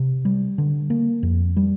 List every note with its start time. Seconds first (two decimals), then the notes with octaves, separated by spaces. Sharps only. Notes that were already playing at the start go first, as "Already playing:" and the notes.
Already playing: C3
0.25 G3
0.58 D3
0.90 A#3
1.23 F2
1.57 G3